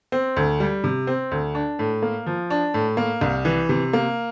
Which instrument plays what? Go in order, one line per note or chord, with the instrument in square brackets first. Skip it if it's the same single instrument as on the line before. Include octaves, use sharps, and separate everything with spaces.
[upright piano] C4
D2
G3
C3
C4
D2
D4
A2
A#3
F3
D4
A2
A#3
C2
E3
C3
A#3